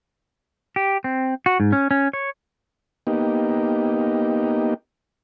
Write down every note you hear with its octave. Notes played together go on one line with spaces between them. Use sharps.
G4
C4
F#4
G#2
C#4
C#4
C#5
A#3 B3 D#4 G4